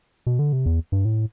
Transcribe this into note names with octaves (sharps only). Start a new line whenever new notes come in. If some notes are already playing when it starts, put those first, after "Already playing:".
B2
D3
C3
E2
G2
A2